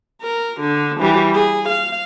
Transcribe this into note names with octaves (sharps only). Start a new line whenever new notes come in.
A#4
D3
E3 G3
G#4
F5